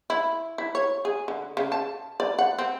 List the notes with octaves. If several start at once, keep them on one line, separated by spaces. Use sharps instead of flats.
E4
E4
C#5
G#4
D3
C#3
A5
D5
F#5
C4